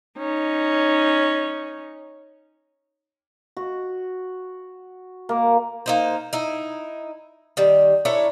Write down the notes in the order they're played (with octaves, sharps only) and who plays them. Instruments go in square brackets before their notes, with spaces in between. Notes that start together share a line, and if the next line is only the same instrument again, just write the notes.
[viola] C#4 D#4
[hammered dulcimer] F#4
A#3
[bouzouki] A#3 D#4 C5
D#4 E4
D#3 G3
D4 E4 A#4 C#5